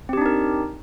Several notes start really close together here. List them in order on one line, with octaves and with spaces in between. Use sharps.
C4 G4 D4 D#4 A#4